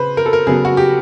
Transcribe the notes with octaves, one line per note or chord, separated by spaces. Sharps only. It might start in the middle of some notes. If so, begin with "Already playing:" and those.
Already playing: C#3 B4 C5
A#4
A4
A#4
C#3 F#3 B3 G#4
F#4
G4